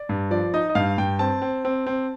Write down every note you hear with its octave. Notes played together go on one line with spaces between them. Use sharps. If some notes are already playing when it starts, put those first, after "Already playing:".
Already playing: D5
G2
F3 D5
D#4 D#5
D#5
G2 F5
G2 G5
C4 A5
C4
C4
C4